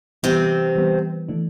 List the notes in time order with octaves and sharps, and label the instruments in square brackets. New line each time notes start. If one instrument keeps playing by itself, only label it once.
[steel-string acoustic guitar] C3 C4 [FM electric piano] E3 G3 B3
[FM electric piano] E3 G3 B3
E3 A3 D4